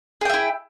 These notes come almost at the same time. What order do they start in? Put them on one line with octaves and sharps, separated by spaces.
G#4 G5 E5 E4